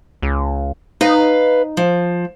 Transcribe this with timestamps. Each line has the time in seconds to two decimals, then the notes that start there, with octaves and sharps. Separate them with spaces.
0.23 C#2
1.01 D#4 B4 F5
1.77 F3